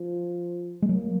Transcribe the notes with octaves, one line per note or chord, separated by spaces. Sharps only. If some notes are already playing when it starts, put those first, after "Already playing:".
Already playing: F3
G#3
F#3 A#3